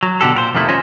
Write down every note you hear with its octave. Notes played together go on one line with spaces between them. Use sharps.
F#3
B2 D3 G4 A4
A#2 A#4 C5
F2 C3 D#3 A3 E4
C#4 F4 C5 C#5 D#5 G#5